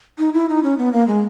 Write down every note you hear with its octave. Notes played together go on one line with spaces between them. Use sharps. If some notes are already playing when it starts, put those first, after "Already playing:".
D#4
E4
D#4
C#4
B3
A#3
G#3